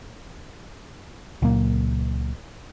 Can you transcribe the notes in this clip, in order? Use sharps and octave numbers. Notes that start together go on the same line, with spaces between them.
C#2 A#2 F#3 A#3